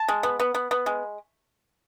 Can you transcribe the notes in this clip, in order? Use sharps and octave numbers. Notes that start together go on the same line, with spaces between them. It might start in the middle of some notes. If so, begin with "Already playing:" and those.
Already playing: A5
G#3
B3
B3
B3
B3
G#3